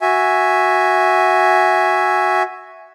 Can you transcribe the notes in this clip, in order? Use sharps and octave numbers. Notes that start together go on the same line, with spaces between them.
F#4 E5 G#5